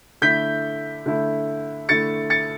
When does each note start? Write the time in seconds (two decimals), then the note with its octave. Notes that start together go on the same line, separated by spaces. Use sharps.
0.22 D3 A3 E4 G6 B6
1.06 D3 A3 E4
1.89 D3 A3 E4 A6 C#7
2.30 A6 C#7